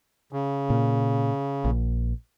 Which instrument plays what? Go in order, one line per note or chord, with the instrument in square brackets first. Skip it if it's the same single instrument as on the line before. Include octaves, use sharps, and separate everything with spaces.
[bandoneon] C#3
[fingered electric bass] A#2
A#1